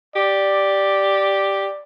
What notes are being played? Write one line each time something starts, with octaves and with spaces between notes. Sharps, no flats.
G4 D5